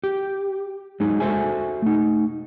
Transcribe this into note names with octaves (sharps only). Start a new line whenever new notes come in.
G4
F#3 G#3 D#4 G#4
F#4 A4 A#4 C5 E5 G#5
A3 D#4